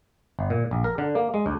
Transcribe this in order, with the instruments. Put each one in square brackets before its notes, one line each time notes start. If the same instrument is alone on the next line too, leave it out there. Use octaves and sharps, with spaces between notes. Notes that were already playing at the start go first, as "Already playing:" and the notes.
[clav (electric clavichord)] G1
A#2
A#1
A#4
D3
A#3
G#3
D2